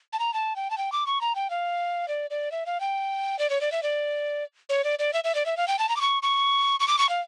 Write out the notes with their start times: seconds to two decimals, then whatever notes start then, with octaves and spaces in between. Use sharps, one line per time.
0.13 A5
0.19 A#5
0.33 A5
0.56 G5
0.70 A5
0.78 G5
0.92 D6
1.06 C#6
1.21 A#5
1.35 G5
1.50 F5
2.08 D5
2.30 D5
2.51 E5
2.66 F5
2.80 G5
3.39 D5
3.50 C#5
3.61 D5
3.72 E5
3.83 D5
4.69 C#5
4.84 D5
4.99 D5
5.13 E5
5.24 E5
5.35 D5
5.46 E5
5.57 F5
5.68 G5
5.79 A5
5.89 A#5
5.96 D6
6.01 C#6
6.22 C#6
6.80 C#6
6.88 D6
6.99 C#6
7.09 F5